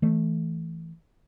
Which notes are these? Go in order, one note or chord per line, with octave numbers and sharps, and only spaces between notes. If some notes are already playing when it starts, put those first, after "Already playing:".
E3 A3